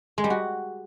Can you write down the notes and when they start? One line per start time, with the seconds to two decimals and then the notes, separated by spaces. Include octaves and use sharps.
0.18 G#3
0.24 G3
0.30 F#4